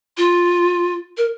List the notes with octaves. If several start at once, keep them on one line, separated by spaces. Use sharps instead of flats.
F4
A#4